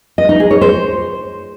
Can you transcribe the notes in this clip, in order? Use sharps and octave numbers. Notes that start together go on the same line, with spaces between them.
D#5
D#4
G#4
C#5
C5